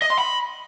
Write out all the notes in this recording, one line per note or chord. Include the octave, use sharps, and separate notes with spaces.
D#5
C6
B5